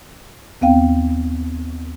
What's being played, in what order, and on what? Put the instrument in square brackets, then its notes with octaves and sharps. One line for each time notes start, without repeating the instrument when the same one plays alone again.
[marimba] D#2 B3 C4 F5 G5